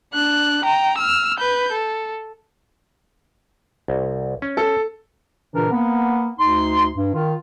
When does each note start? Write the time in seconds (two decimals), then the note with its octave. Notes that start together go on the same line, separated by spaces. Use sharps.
0.14 D4 F#6
0.64 G5 A#5
0.98 E6 F6
1.38 B4 G6
1.72 A4
3.88 C2
4.42 C#4
4.57 A4
5.54 A#2 C#3 E3 D4 A#4
5.71 A#3 B3
6.38 D2 D#4 C6
6.96 G2
7.14 D#3 F4